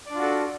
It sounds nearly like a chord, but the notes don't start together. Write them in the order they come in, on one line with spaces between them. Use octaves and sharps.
D5 D4 F4 F#4 A4